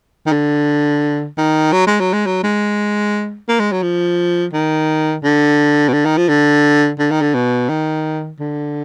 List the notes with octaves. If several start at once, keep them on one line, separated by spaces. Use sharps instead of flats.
D#3
D3
D#3
F#3
G#3
F#3
G#3
F#3
G#3
A#3
G#3
F#3
F3
D#3
D3
B2
D3
D#3
F3
D3
D3
D#3
D3
B2
D#3
D3